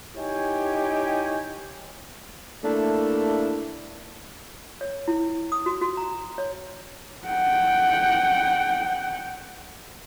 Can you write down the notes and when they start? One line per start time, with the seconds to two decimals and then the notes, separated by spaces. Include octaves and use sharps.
0.16 D#4 E4 G4 C#5 G5 G#5
2.64 A3 A#3 D4 E4 A4
4.81 C#5
5.08 E4
5.52 D#6
5.66 F#4
5.81 F#4
5.97 A#5
6.38 C#5
7.28 F#5 G5